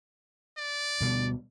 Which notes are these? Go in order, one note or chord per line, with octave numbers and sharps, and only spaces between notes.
D5
D2 B2 G3